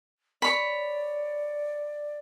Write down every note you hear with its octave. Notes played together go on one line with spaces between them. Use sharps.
C#5 D5 B5